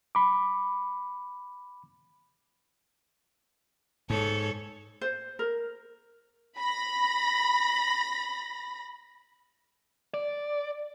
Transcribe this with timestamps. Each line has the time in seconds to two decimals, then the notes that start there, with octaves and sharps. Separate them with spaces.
0.15 B5 D6
4.10 G#2 A4 C#5
5.01 C5
5.39 A#4
6.58 B5 A#6
10.14 D5